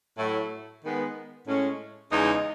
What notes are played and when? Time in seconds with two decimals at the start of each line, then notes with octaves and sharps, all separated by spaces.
0.18 A2 F#3 A3 E4
0.83 D#3 G#3 B3
1.46 A2 G#3 C#4
2.11 E2 C#3 G#3 D#4